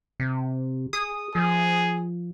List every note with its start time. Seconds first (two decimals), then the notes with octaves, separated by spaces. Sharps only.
0.20 C3
0.93 G#4 D#6
1.35 F3 G#4